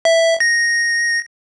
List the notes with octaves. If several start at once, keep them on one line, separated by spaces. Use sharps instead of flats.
E5
A#6